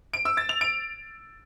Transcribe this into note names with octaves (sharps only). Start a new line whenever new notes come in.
D7
E6
A6
F7
D7